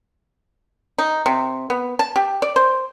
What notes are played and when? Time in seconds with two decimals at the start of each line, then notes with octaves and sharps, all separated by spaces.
0.98 D#4
1.26 C3
1.70 B3
1.99 A5
2.16 G4
2.42 D5
2.56 C5